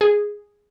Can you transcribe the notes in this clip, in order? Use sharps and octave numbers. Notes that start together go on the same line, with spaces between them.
G#4